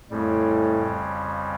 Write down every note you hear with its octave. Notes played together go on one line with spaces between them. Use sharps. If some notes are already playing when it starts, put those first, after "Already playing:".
F2 A2 C#3 G3